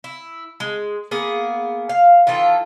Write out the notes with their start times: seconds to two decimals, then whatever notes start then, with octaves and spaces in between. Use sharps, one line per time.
0.04 E4
0.60 G#3
1.11 A#3 B3 G#4
1.89 F5
2.27 D#3 E3 F4 A4